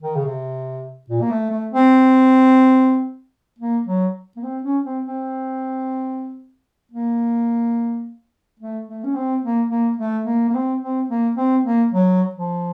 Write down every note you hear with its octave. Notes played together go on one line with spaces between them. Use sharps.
D#3
C#3
C3
A#2
A#3
A3
A3
C4
A#3
F#3
A#3
C4
C#4
C4
C4
A#3
A3
A3
C#4
C4
A#3
A#3
A3
A#3
A#3
C4
C4
A#3
C4
A#3
F#3
F3